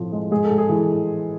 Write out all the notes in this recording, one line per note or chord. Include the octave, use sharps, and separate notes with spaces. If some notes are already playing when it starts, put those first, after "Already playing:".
Already playing: A2 F3 C4
G#3
G#2 G#4
A4
G#2
G#4
E3